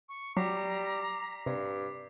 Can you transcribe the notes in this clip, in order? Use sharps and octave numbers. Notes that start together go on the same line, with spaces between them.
C#6
F#3 G3 A#5 D6 B6 C7
G2 C3